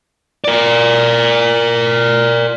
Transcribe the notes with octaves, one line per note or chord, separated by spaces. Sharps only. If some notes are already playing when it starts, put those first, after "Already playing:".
A#4 D5